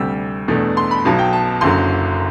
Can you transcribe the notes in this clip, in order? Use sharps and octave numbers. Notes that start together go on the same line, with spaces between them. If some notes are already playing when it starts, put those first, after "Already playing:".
Already playing: D2 C3 G3 E6
E2 B2 A3 D4
C6
B5
B1 B2 F#3 A5
G5
A5
F#1 F#2 D3 F#3 C6